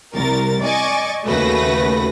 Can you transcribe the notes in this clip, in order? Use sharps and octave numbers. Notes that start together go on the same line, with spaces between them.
C2 G3 A#4 A6
D5 D#5 G#5 C#6 D6 A6
D#2 C#3 A3 F#4 B4 A#6